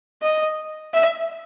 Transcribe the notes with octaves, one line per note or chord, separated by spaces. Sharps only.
D#5
E5